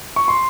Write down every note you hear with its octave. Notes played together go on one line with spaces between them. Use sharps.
C#6
C6